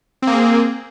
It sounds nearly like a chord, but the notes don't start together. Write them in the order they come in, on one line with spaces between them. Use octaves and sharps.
C4 A#3 G#4